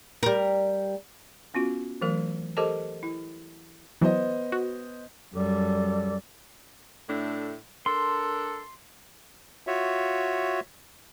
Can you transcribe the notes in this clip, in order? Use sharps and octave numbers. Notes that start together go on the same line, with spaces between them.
G3 A#4
B3 C#4 F4 F#4
E3 F#3 A3 A#4
G4 A4 A#4 C5 D#5 A5
E4
E3 F#3 B3 C5 D#5
F#4
F#2 G3 A4 D5 D6
A2 A3 D4
D4 A4 A#4 C6
F4 F#4 C#5 E5